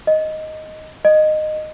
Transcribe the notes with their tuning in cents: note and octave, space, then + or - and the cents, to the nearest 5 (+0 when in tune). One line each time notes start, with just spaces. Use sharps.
D#5 +5
D#5 -15